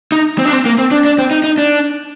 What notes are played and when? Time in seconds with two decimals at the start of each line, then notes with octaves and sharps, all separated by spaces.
0.12 D#4
0.39 C4
0.46 D4
0.53 C4
0.66 A#3
0.78 C4
0.91 D4
1.05 D4
1.18 C4
1.31 D#4
1.44 D#4
1.58 D4